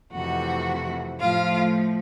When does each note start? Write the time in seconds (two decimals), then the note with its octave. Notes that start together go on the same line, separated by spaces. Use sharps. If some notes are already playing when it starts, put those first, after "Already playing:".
0.11 F2 C3 E3 A3 F#4 F#5
1.18 A2 F3 A3 F4 F5